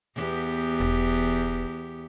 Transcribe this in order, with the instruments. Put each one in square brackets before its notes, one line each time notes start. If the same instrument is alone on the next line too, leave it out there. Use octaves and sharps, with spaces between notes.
[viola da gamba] E2 B3 G4
[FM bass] E1